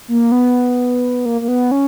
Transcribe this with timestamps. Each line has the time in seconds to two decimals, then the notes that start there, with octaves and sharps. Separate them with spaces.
0.08 A#3
0.32 B3
1.25 A#3
1.41 A#3
1.48 B3
1.71 C#4